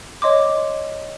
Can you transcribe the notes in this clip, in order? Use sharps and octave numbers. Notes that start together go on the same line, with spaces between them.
C#5 D#5 C6 D6